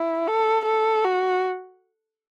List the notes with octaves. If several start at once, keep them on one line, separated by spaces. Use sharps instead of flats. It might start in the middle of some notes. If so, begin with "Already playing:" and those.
Already playing: E4
A4
A4
F#4